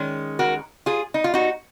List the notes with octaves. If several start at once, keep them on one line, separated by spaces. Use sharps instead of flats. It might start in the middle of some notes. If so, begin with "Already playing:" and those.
Already playing: D#3 G#3 C#4
F#4 A#4
F4 G#4
D#4
F4
D#4 F#4